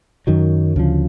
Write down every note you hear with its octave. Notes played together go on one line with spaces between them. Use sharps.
F#2 D#3 F#3
D2 C#3 F3